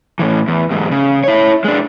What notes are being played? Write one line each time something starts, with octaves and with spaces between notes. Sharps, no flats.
A2 E3
E2
E2 G#2
C#3
E4 C#5
G#3 D4